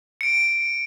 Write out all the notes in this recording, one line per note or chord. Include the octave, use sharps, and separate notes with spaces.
C#7 D7